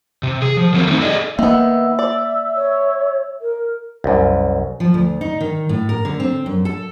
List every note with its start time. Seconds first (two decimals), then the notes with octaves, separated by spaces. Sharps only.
0.23 C3
0.42 G#4
0.57 F3
0.73 D#3 F#3 C4 A#4
0.87 A3 C4 D#4
1.02 G#4 A4 D5 D#5
1.39 D#3 A#3 B3 E5
1.99 D5
2.55 C#5
3.41 A#4
4.04 C2 F#2
4.80 F3
4.94 D2
5.21 D#4
5.40 D#3
5.69 A2
5.89 A#4
6.05 D3
6.20 C4
6.46 F#2
6.65 A4